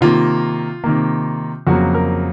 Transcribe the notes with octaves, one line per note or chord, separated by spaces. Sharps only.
C3 D#3 A#3 F4
C3 D#3 A#3
F2 C#3 F#3 A#3 F#4
A#4